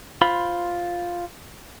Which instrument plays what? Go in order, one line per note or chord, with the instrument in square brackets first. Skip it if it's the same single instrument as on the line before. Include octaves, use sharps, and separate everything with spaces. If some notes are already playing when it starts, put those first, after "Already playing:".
[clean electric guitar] F4 C5 B5